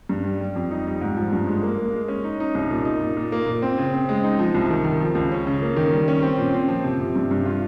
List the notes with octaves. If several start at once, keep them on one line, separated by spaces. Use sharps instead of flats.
G2
G3
G3
F2
D#4
G3
G#2
F3
G2
G#3
A#3
A#3
G#3
C#4
D#4
D#4
C2
A#2
D#4
A#2
A#2
A#3
A#2
C4
C#3
C4
G#3
D#4
F3
C2
D#3
D#3
F3
C#2
C#4
C#3
A#3
D#3
G3
C#4
C4
A#2
C4
F3
C3
C3
G2
G2
F4